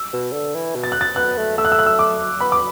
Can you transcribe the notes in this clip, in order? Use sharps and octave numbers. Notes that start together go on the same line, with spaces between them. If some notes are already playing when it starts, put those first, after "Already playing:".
Already playing: E6
B2
D3
E3
B2
A6
F#6
A6
B3 F#6
A3
A3 E6
F#6
E6
F#6
E6
D6
B3 B5
D6